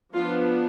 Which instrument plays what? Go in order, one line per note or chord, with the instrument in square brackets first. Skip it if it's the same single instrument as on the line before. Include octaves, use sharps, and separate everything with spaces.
[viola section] F3 B3 D4 F4